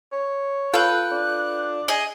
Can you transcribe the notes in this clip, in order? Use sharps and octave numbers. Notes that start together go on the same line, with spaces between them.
C#5
F4 A4 B4 F5 G5 F#6
D4
G#4 D#5